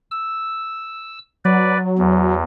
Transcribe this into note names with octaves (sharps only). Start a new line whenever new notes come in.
E6
F#3 B4 D5
E2